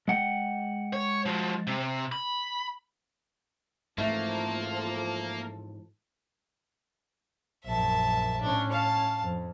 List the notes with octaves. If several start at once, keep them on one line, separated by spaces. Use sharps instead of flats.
G#3 F#5 G5
C#5
F3 F#4
C3
B5
G#2 E3 F3 A3 A#3 A4
A#1 F#2 E5 A5
A2 C#4 D4
F5 A5
F2